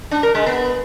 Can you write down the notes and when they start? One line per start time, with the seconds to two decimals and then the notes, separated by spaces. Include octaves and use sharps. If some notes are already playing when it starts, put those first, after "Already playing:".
0.11 D4
0.23 A#4
0.35 G#3
0.46 B3